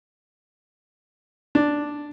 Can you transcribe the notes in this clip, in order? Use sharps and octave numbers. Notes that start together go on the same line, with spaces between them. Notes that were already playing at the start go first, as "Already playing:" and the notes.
D4